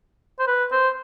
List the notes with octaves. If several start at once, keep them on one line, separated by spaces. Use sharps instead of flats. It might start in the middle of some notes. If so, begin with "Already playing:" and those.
C5
B4
C5